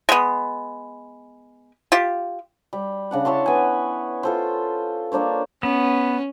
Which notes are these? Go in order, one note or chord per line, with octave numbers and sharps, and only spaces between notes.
G#3 B3
F4 G4
G3
C#3 D4 F#5
E4 C#5 A5 C6
B3 G#5
F4 A4 C5
A#3 D4 C5 C#5
B3 C#4